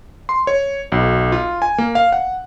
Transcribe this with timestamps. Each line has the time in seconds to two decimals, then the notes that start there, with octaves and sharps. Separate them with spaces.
0.29 C6
0.47 C#5
0.92 B1
1.32 F4
1.62 G#5
1.78 A#3
1.95 F5
2.12 F#5